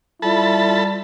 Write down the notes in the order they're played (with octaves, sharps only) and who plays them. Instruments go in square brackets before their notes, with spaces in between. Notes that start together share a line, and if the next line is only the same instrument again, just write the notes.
[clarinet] G3 [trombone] E4 [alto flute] F4 [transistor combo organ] A4 A5 B5